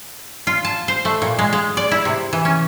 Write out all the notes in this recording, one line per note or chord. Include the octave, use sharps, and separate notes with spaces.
F4
A5
C5
A3
A#2
G#3
G#3
D5
E4
C3
E3
C#4